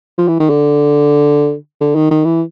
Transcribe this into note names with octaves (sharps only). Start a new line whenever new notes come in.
F3
E3
D#3
D3
D3
D#3
D#3
E3